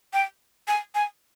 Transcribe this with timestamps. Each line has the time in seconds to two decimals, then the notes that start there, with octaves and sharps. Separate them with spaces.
0.13 G5
0.68 G#5
0.95 G#5